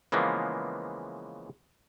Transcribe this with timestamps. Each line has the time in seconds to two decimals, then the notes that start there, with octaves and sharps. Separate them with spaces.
0.12 C#3 E3 F3 G#3 A#3 B3